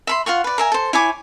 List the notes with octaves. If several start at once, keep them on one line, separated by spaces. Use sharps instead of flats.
E5 B5 C6
F4 F5 F#5 C#6
B4 D5
A#4 E5 G#5
A4 C5
E4 C#5 G#5 D6